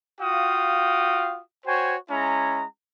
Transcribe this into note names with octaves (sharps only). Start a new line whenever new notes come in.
F4 F#4 F5 G5 D#6
F#4 C5 C#5 G5 G#5
G#3 C#4 E4 A#5